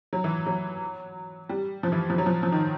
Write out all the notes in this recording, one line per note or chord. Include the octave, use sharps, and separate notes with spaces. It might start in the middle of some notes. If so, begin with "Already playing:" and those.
F#3
E3
F#3
G3
F3
E3
F3
F#3
F3
F3
D#3